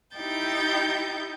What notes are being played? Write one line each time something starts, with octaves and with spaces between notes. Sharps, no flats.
D#4 E4 G4 G5 G6 A6